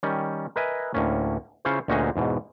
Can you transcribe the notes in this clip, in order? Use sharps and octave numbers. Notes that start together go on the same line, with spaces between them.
D#3 G3 C#4
A#4 B4 D#5 E5 G#5
D2 A2 A#3 C#4
C#3 C#4 E4 F4 C5 C#5
D2 A#2 C#4 D#4 F#4 G#4
E2 G#2 B2